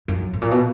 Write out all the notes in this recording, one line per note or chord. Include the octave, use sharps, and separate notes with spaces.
F#2
A2
A#2
B2